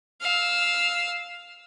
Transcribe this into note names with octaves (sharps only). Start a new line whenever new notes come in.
F5 E6